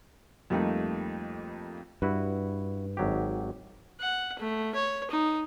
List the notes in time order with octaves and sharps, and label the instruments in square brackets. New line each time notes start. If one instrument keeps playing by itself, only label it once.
[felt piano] F2 G3 A3 A#3 D#4
[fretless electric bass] G2 [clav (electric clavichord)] E4 F#4 B4
[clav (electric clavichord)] G#1 F#3 G4
[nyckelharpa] F#5
A3
C#5
D#4